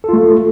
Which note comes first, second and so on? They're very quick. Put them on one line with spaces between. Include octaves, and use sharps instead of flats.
A4 F4 A3